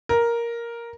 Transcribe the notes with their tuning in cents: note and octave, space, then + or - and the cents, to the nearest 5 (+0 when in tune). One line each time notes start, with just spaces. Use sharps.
A#4 +5